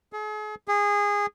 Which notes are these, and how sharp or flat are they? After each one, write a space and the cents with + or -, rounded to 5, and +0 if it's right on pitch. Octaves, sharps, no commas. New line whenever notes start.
G#4 +40
G#4 -20